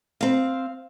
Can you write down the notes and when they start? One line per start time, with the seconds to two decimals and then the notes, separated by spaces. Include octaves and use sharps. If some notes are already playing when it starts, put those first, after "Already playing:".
0.21 C4 F5